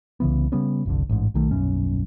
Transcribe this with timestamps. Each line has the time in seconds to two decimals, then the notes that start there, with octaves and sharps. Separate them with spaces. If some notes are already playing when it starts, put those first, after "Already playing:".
0.20 C2 C#3 E3 B3
0.52 C#3 G3 B3 C#4
0.86 F#1 C2 D3
1.09 A1 G#2
1.34 B1 D#3 A3
1.51 D#1 B1 F#2 C#4